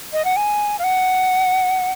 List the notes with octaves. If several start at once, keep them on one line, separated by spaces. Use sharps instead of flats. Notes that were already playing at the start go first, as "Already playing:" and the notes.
D#5
F#5
G#5
F5
F#5